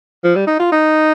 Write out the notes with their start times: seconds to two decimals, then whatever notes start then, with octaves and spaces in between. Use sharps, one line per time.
0.24 F3
0.35 G3
0.47 D#4
0.59 F4
0.72 D#4